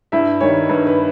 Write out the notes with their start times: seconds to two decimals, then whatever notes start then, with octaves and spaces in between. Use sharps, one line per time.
0.12 G2 E4 E5
0.40 D#3 G3 C#5
0.69 G2 B4
0.87 B4